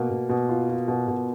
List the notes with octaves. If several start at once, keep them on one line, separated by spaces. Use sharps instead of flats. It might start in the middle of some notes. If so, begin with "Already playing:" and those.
Already playing: B2 A#3
B2
B2
F4
F4
B2
B2